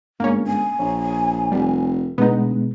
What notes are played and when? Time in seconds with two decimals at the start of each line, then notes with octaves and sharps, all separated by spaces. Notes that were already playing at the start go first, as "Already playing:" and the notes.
0.20 G1 G2 G#3 A#3 C#4
0.47 G#5
0.79 A#1 C#5
1.52 F1 G3
2.18 D2 B2 G#3 B3 D#4